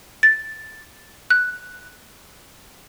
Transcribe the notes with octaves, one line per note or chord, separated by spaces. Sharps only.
A6
F#6